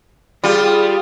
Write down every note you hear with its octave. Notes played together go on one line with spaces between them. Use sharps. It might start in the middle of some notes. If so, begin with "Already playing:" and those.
G3 F4 G#4